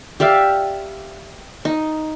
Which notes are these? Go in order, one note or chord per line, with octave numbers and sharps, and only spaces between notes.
G4 D5 E5 F5
D#4